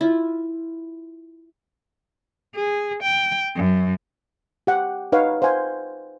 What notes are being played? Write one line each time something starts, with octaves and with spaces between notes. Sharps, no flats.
E4 F4
G#4
G5
F#2
G4 F#5 G5
D#4 B4 C#5 F5 F#5
C5 F5 F#5 G#5